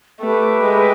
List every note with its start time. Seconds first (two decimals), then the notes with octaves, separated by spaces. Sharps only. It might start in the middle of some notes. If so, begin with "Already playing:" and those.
0.20 A3 G4 B4 E5 G5
0.63 G#3